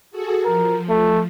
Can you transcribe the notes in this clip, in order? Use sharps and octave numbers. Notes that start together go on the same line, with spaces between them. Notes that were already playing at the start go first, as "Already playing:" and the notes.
F#4 G#4 A4
F3 A#4
A3